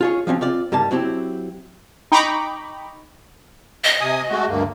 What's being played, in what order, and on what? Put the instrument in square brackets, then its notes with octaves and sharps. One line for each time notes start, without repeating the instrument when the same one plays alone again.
[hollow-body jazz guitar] F4 G#4 C#5
F3 F#3 C4 C#4
C4 F4 D5
G2 G3 A#3 A5
F#3 C4 E4 G4
[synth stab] D#4 G5 A#5 B5 C#6 D6
[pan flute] D#5
[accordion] C3 G#5 D#6
G#3 A3 F#4
D2 G2 A#3